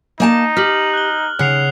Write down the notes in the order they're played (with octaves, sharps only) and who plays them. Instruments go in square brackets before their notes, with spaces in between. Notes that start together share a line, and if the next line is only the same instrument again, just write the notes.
[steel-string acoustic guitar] A#3 G#5 A5 [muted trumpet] D#4
[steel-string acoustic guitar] G4 [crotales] F6 F#7
[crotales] F#6 G7
[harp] C#3 [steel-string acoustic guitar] F#5 [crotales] F#6 C7 F7